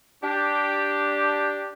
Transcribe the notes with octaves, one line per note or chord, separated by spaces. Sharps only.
D4 G4